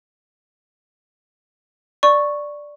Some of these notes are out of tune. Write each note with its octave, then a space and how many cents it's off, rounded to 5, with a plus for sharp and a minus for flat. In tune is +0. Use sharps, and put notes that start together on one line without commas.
D5 +0 C#6 -5